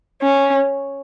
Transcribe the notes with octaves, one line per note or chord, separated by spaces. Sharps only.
C#4